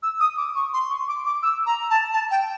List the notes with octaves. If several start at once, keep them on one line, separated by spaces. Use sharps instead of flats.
E6
D#6
D6
C#6
C6
C#6
D6
D6
E6
A#5
A5
A5
G5